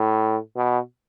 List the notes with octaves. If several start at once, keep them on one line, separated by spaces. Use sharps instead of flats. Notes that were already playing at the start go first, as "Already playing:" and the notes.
Already playing: A2
B2